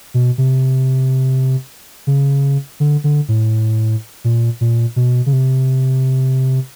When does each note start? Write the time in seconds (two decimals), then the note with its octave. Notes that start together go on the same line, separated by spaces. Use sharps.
0.14 B2
0.38 C3
2.07 C#3
2.80 D3
3.04 D3
3.28 A2
4.24 A#2
4.61 A#2
4.96 B2
5.26 C#3
5.33 C3